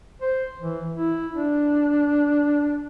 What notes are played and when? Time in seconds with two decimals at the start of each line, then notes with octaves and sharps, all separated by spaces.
0.22 C5
0.60 E3
0.93 E4
1.34 D4